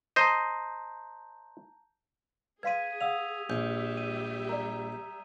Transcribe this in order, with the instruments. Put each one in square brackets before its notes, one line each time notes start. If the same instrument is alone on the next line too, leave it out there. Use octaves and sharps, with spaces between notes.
[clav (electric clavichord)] C5 D#5 [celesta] A5 A#5 G6
[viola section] G#4 [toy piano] B4 F5 C6 [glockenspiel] G#6 B6 D#7
[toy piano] F5 F#5 [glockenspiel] D#6 E6 F7
[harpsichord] A#1 [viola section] G3 G4 E5 [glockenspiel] G6
[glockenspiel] D#7
[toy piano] A#4 D5 [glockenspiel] A#5